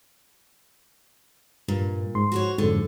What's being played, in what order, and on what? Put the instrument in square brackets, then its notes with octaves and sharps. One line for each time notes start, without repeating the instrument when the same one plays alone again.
[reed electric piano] G2 [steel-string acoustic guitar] A#2
[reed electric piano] G#2 C6
[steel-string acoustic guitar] F#4 C5 C#5
[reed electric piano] F2 G#2 [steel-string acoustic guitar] D3